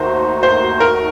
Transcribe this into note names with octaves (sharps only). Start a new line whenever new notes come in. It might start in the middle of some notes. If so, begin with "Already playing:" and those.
Already playing: D#2 D#3 A3 D#4 F#4 C5
C5
A#4